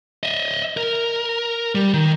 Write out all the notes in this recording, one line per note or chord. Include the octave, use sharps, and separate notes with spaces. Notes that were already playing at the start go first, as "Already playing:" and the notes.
D#5 E5
A#4
G3
D#3